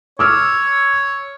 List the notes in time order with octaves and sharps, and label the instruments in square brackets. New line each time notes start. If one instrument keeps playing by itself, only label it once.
[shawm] C#5 [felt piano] D6 E6 F6